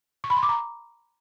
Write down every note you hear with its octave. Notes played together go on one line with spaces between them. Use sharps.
C#6
B5
C6
D6
A#5